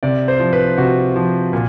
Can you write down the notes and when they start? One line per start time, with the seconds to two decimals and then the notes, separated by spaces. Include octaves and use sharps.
0.03 C3 D5
0.28 C5
0.40 F3
0.53 B4
0.78 C3 F#4
1.16 F3
1.53 A#2